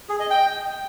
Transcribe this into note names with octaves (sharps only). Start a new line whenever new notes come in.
G#4
D#5
G5